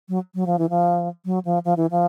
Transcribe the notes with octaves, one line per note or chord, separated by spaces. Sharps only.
F#3
F#3
F3
E3
F3
F#3
F3
F3
E3
F3